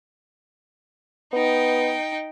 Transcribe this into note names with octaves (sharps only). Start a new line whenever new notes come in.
B3 D#4 G5